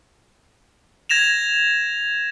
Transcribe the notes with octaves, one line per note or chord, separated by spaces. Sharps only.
G#6 A#6 E7 F7